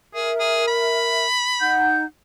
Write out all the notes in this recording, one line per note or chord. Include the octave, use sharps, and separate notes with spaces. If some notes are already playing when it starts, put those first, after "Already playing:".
G#4 A#4 E5
G#4
B5
D#4 F#5 G6